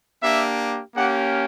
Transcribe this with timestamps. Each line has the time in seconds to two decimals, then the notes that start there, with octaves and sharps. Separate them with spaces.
0.23 A#3 D4 G4 E5
0.96 A#3 C#4 G4 F#5